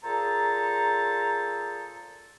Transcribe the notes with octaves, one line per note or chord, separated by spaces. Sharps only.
A#2 G#4 A4 C5 A#5